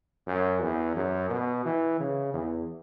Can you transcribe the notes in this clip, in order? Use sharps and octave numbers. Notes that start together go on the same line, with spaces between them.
F#2
E2
F#2
B2
E3
C#3
E2